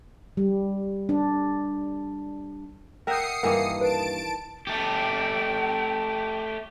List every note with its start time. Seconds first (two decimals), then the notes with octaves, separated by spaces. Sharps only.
0.37 G3
1.09 D4
3.07 A#4 E5 F#5 G5 D#6 G6 C7 C#7
3.43 G2 D#3 E3 A#3 E5 F#5 D6
3.81 B4 A5 D7
4.67 A3 G4 G5